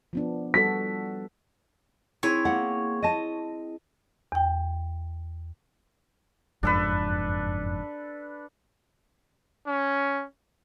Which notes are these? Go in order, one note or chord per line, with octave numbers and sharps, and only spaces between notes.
F3 B3 D4
G3 F#4 A4 B6
C4 E4 G#4 C#5
A#3 F#5
D#5 A5 A#6 D#7
E2 G5
F#1 F2 G#2 D4 A4 B4
C#4